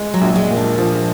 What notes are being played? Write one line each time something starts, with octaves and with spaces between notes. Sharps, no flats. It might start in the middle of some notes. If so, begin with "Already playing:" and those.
Already playing: G#3
F#3
A#1
G#3
A#2
D4
F3 D4